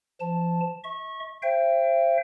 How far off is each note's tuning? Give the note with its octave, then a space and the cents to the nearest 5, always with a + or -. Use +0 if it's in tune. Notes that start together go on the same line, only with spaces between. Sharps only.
F3 -30 A5 +0
E5 -45 C#6 -20
C5 +15 E5 +40 G5 +0